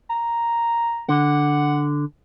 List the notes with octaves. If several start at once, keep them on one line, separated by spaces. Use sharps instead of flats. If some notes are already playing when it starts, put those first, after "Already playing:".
A#5
D3 F#5